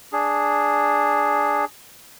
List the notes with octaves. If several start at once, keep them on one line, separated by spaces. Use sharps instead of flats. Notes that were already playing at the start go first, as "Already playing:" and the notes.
D4 G#4